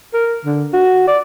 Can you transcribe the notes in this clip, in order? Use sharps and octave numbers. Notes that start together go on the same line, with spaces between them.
A#4
D3
F#4
D5